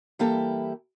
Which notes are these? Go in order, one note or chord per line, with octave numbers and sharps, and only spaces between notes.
E3 G3 A#3 E4 G4 A4